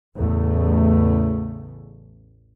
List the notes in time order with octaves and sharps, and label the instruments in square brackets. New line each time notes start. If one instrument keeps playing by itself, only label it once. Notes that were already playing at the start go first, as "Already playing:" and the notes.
[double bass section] A1 E2 C#3 A3